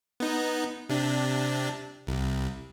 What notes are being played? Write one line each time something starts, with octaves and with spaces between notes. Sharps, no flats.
B3 D#4
C3 D4
C2